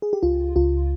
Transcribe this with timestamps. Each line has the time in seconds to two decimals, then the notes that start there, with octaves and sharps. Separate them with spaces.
0.02 G#4
0.13 G4
0.23 C#2 F4
0.56 C#2 F4